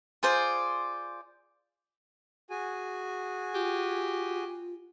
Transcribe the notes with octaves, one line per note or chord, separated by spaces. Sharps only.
F4 G#4 C5 D5
F#4 G#4 G#5
F4 G4